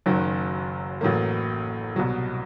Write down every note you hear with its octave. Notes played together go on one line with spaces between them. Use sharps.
F#1 F#2 D#3 F#3
A1 A2 F#3 A#3
C2 B2 F#3